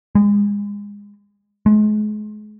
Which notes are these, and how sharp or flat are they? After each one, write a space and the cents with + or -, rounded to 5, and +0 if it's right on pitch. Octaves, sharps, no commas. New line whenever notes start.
G#3 -30
G#3 +35